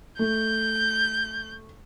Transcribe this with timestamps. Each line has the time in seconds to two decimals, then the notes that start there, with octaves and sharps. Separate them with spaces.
0.19 A3 G6